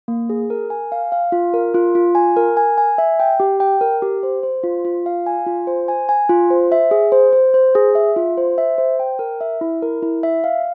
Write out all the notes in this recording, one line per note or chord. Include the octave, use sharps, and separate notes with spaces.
A#3
G#4
A#4
G#5
F5
F5
F4
A#4
F4
F4
G#5
A#4
G#5
G#5
E5
G5
G4
G5
A#4
G4
C5
C5
F4
F4
F5
G#5
F4
C5
G#5
G#5
F4
C5
E5
G#4
C5
C5
C5
G#4
E5
F4
C5
E5
C5
G5
A#4
E5
E4
A#4
E4
E5
F5